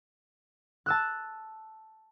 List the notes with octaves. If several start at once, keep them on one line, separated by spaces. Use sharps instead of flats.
A5 E6 F#6